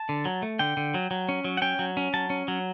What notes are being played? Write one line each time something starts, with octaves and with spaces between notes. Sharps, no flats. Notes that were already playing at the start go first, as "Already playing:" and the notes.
Already playing: A5
D3
F#3
A3
D3 G5
D3
F#3
F#3
C#4
F#3
F#5
C#4 G5
F#3
C#4
F#3 A5
C#4
F#3